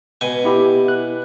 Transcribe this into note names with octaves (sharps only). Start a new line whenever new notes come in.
B2 G#5
B3 E4 G4
F#6